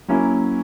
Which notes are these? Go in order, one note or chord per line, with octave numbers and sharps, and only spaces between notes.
F#3 A#3 C#4 E4